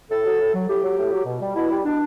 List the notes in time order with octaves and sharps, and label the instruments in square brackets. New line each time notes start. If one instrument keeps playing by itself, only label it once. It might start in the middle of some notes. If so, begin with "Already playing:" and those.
[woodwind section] A2 A4
F#3
A2
F#3
A2 G4
F#3
A2
F#3
B2
G3
B2 E4
G3
B2 D4